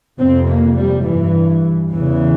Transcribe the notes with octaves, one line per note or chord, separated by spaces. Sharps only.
F2 C3 C4
A#3
G3
G2 E3
E2 C#3 E3